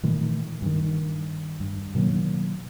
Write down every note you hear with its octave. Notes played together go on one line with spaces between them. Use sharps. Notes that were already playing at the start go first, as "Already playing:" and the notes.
A#2 D#3 E3 A3
G2 D#3
G2
B2 D#3 F#3 A#3